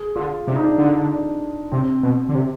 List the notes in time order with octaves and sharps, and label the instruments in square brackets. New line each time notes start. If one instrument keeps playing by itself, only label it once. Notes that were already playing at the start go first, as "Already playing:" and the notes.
Already playing: [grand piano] G#4
[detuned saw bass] D3 [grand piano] F4
[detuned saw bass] C3 [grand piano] D4
[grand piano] D#4
D4
[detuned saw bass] D3
[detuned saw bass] C3 [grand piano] C4
[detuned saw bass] B2
D3
C3